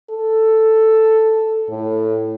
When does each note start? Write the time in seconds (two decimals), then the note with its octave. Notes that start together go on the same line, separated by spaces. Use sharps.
0.10 A4
1.70 A2